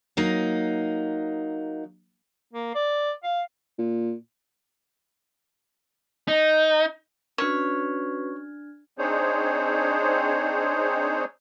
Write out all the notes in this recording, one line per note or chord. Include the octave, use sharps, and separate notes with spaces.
F#3 A#3 D#4
A#3
D5
F5
A#2
D#4
C#4 D4 F#4 B4 C#5 F6 G#6
C4 D4 D#4 G#4 C5 C#5